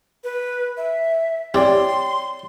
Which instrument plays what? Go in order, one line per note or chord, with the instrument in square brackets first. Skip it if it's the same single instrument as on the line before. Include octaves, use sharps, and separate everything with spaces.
[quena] B4
E5
[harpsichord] C4 E4 G4 [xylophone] C#5 D5 G5 [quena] C6